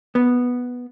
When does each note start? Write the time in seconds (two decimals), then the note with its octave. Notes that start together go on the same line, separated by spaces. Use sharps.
0.15 B3